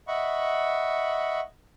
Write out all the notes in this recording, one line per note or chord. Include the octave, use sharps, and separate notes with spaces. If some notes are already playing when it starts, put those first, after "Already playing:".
D#5 E5 F#5 B5 C#6